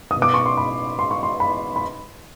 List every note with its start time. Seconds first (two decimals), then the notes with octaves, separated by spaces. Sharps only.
0.11 D#6
0.16 B2
0.22 D6
0.34 C#6
0.46 C6
0.57 B5
0.99 C6
1.11 C#6
1.23 C6
1.40 B5
1.76 B5